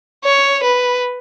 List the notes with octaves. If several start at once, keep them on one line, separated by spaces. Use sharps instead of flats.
C#5
B4